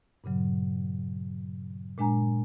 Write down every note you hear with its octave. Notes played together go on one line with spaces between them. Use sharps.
G2 A#2 C#3 F#3
A#2 G#3 D4 G#5 A#5